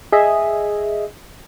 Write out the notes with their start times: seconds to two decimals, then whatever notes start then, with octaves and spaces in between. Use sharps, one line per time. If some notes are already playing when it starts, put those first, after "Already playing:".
0.12 G#4 D#5 E5